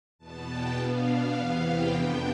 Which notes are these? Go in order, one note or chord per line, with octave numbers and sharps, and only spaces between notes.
E2 B2 B3 A5
G5
B2 B3 D4 F5
E2 C3 E3 B3 F5
G5
F2 C3 F3 B3 D4